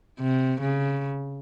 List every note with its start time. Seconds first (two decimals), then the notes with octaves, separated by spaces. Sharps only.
0.20 C3
0.62 C#3